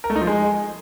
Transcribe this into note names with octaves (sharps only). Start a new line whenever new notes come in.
A#4
A3
D#4
F3
G#3